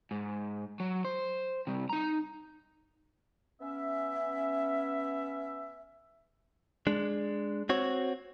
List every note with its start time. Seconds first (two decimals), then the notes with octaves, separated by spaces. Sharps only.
0.11 G#2
0.80 F#3
1.05 C5
1.67 C3 G3
1.89 D#4 A#5
3.61 B3 C#4 E5
6.87 G#3 D4
7.69 C4 F#4 C#5